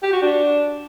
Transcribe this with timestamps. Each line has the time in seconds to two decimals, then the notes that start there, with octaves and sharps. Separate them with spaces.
0.03 G4
0.13 F#4
0.22 D4